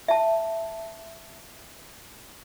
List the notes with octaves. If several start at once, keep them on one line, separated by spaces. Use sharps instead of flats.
E5 A5